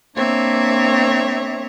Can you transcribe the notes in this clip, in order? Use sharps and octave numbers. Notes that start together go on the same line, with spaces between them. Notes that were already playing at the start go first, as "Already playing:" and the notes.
A#3 C4 D4 C#5 E5